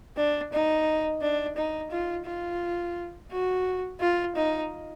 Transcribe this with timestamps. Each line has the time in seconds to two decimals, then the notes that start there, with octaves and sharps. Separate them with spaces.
0.17 D4
0.53 D#4
1.21 D4
1.56 D#4
1.91 F4
2.26 F4
3.31 F#4
4.00 F4
4.35 D#4